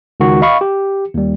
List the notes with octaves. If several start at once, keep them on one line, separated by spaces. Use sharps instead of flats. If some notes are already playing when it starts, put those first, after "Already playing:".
C#2 D#3 F#4
D#5 F5 B5 C#6
G4
D#2 G3